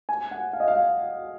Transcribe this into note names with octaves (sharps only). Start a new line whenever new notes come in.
G#5
F#5
F5
D#5
F5